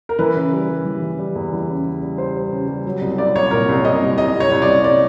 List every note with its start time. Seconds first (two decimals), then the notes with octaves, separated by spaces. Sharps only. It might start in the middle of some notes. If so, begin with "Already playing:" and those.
0.09 A#4
0.19 E3 B4
0.36 C#3
0.53 G3
0.69 G3
0.85 E3
1.02 E3
1.19 G3
1.35 E2
1.52 E3
1.69 C#3
1.85 C#3
2.02 G3
2.18 G3 C5
2.35 G3
2.52 C#3
2.68 G3
2.86 F#3
3.01 C2
3.18 C2 D5
3.35 C2 C#5
3.51 A#2 A#4
3.69 C2
3.85 C2 D#5
4.02 C2
4.18 C2 D#5
4.35 C2
4.40 C#5
4.51 C2
4.62 D5
4.68 C2
4.84 D5